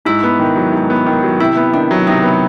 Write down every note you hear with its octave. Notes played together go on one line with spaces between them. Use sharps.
G#2 E4
B3
D#3
F#3
G#2
B3
D#3
F#3
C3 E4
B3
D#3 D4
F#3
C3 D#4
B3